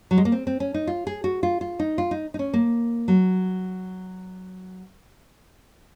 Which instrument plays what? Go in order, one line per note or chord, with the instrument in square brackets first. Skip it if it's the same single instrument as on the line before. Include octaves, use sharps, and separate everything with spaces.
[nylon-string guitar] F#3
G#3
A#3
C4
C4
C#4
D#4
F4
G#4
F#4
F4
F4
D#4
F4
D#4
D#4
C#4
A#3
F#3